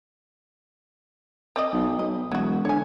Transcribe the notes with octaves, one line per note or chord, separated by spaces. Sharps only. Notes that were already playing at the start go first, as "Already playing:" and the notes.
C4 D5 D#5
B1
B1 D#5
E1 F#3 F#4
D3 C#5 G#5